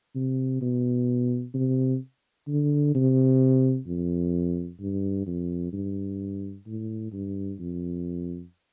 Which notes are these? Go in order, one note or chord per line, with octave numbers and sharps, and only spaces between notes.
C3
B2
C3
D3
C3
F2
G2
F2
G2
A2
G2
F2